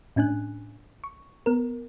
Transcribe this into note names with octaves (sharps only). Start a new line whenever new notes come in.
A2 C#4 D4 G#5 F#6
C#6
B3 A#4